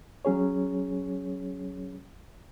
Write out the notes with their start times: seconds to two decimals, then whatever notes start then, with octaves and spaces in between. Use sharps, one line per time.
0.25 F#3 C#4 G#4 C#5